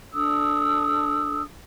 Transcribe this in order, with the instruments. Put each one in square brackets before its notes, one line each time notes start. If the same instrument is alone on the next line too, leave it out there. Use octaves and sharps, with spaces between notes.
[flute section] D4 A4 D#6 E6